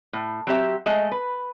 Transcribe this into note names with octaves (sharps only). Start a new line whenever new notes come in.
A2
F#3 C4 G4 E5
G#3 A3 D#5
B4